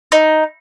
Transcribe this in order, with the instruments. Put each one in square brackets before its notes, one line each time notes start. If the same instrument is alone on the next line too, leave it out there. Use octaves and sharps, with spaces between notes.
[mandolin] D#4